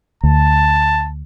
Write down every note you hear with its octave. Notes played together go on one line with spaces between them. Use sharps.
D2 A5